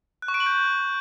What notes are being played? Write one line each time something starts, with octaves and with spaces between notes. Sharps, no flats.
F#6
C#6
D7
F#7
G6